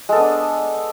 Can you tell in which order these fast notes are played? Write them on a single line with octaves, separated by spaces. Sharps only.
G#3 A4 B3 D4